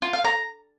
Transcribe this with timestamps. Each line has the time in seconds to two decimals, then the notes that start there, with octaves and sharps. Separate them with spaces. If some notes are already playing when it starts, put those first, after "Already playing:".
0.02 F4
0.13 F5
0.25 A#5